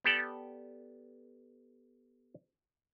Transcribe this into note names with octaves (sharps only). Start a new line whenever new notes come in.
B3 G4 A4 D5